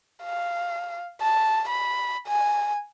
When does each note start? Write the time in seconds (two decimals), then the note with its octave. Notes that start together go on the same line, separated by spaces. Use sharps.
0.23 F5
1.21 A5
1.69 B5
2.27 G#5